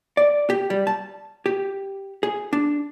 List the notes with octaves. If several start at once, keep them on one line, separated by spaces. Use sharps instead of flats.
D5
G4
G3
A5
G4
G#4
D4